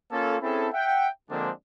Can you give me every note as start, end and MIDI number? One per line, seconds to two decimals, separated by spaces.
0.12 0.37 58
0.12 0.37 61
0.12 0.37 65
0.12 0.37 69
0.42 0.68 60
0.42 0.68 61
0.42 0.68 64
0.42 0.68 68
0.42 0.68 69
0.73 1.08 76
0.73 1.08 78
0.73 1.08 79
1.30 1.51 50
1.30 1.51 53
1.30 1.51 56
1.30 1.51 58
1.30 1.51 60
1.30 1.51 62